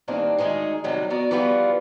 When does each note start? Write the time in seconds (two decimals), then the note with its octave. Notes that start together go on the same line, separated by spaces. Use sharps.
0.08 G2 D#3 E3 A#3 C4 D4
0.38 D2 D#3 G#3 D#4 G#4
0.84 A2 C3 D#3 F#3 G3
1.10 B3 F#4 A#4 D5
1.31 E3 F3 G3 B3 F4 F#4